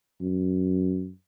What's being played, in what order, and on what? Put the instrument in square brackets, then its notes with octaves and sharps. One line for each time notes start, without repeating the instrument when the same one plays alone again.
[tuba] F#2